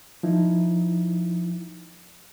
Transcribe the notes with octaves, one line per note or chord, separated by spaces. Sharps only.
F3 D#4 E4